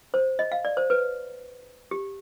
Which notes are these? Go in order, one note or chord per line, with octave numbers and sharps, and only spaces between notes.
C5
D#5
F5
D5
C5
B4
G4